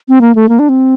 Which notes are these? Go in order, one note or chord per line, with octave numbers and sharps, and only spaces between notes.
C4
A#3
A3
A#3
D4
C4